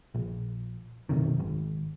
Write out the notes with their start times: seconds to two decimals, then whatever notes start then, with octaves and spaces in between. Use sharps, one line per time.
0.15 A#1
1.09 B1 F#2 C3 D#3
1.39 G#1